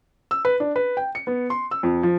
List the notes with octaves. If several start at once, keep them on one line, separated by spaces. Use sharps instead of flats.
E6
B4
D4
B4
G5
C#7
B3
C6
E6
F2
F3